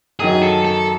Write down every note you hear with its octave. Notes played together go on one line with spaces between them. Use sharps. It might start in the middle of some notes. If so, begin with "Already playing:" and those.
F#2 D#3 F#3 G#4
A4
A4